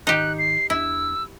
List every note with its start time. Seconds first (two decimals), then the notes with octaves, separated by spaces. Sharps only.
0.07 G#1 D#3 D#4 G4 F#6
0.39 C7
0.70 E2 D4 E4 E6